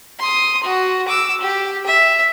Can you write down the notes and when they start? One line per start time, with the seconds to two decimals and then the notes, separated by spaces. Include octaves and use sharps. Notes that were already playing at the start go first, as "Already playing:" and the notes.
0.19 C6 D#6
0.63 F#4
1.08 D6 E6
1.41 G4
1.86 E5